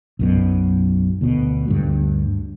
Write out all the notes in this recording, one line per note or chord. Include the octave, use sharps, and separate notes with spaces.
B1 F#2 B2
D2 B2
D2 G2